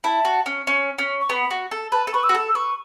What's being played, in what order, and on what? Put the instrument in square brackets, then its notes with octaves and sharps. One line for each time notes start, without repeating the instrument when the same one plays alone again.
[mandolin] E4 [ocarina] A5
[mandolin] F#4
C#4
C#4
C#4
[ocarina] C#6
[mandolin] B3 [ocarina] B5
[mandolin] F#4
A4
[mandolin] B4 [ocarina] A5
[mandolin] A4
[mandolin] B4 [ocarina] C#6
[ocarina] E6
[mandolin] F#4
A4
[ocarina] E6
[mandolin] B4 [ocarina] C#6